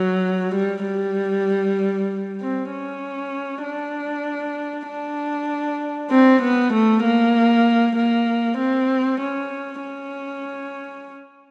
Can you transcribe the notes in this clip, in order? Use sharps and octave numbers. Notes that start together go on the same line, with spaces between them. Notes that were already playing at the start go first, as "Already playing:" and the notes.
Already playing: F#3
G3
G3
C4
C#4
D4
D4
C4
B3
A3
A#3
A#3
C4
C#4
C#4